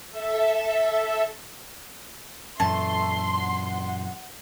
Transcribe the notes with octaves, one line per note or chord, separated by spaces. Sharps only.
A4 E5
F#2 A#2 E3 A3 A5 C6
F#5